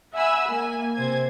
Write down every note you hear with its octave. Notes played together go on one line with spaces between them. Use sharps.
E5 F#5 G#5 B5 E6
A#3 G#5
C3 C5 G#6